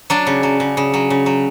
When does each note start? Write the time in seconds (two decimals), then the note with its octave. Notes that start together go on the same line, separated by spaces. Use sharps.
0.10 F#3 D4
0.27 C#3
0.43 F#3
0.60 C#3
0.77 C#3
0.94 F#3
1.10 C#3
1.26 F#3